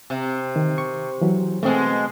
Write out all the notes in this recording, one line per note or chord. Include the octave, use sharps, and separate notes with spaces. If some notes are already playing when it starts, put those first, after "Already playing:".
C3
D#3
C#6
E3 F#3
B2 G#3 A3 C4